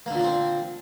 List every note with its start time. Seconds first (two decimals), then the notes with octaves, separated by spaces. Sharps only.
0.06 A#3
0.11 D3
0.15 A#2
0.19 D4
0.24 C4